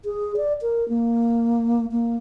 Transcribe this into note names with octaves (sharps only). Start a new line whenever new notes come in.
G#4
D5
A#4
A#3
A#3